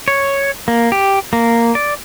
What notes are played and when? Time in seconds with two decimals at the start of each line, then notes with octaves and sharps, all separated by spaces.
0.08 C#5
0.68 A#3
0.92 G4
1.33 A#3
1.75 D5